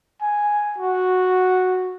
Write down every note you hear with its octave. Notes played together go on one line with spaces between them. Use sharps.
G#5
F#4